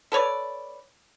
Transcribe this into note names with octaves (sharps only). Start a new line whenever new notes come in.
A4 B4 C#5 D5